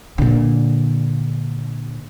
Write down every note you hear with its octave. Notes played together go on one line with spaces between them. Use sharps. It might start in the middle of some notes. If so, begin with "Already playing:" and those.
A#2 D3